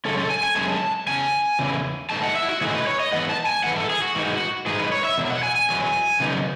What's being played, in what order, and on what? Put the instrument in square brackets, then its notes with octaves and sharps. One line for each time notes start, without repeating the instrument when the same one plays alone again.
[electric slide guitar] F#2 C#3 G#3 C#4 A4
A4
G#5
G#5
F#2 C#3 G#3 C#4 A5
E2 C#3 G#5
E2 C#3 E3
G#2 E3 A3 D#4 A5
F#5
E5
E4
F#4
G#2 E3 A3 D#4 G#4
B4
C#5
D#5
G#2 E3 B3 F#5
A5
G#5
G#2 E3 B3 F#5
A4
G#4
F#4
G#2 E3 G#3 D#4
G#2 E3 G#3 D#4 G#4
B4
C#5
E5
E2 B2 F#3
F#5
G#5
G#5
E2 B2 F#3
C#3 F#3 B3 D#4